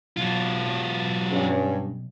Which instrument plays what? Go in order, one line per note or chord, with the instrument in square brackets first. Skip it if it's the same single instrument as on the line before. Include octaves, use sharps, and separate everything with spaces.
[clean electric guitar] B1 [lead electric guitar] F#3 F4
[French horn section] G2 C#4